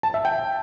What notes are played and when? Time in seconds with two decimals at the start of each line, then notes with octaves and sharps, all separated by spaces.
0.03 A5
0.14 E5
0.25 G5